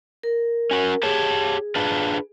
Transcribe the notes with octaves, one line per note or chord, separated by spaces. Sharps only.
A#4
C#4 F#4
G4 G#4 C#5 A5
D4 F4 B4